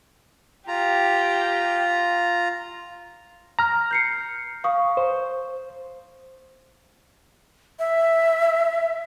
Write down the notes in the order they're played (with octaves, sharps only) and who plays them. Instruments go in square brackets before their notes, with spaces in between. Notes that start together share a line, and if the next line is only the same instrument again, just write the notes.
[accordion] F4 A#5 [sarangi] G4
[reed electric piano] A#5 F6
[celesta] G6 C7 C#7
F5 C#6 D#6
[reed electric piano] C5
[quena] E5